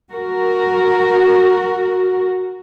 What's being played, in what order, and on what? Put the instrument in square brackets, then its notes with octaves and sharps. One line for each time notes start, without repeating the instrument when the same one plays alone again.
[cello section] F#4 A#4